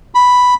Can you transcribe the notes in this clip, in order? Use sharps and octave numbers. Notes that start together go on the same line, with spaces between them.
B5